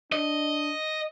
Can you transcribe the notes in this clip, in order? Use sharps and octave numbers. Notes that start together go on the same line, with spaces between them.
D4 D#5